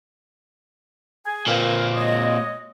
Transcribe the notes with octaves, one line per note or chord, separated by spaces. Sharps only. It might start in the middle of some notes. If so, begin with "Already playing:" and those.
G#4 G#5
A#2 C4 A#4 B4 F5
G#3 C#5 D#5